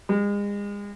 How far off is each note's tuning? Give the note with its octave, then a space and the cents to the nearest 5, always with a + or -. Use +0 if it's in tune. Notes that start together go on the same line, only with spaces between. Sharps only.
G#3 -35